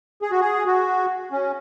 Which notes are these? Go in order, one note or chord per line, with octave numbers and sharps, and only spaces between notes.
G#4
F#4
G#4
F#4
C#4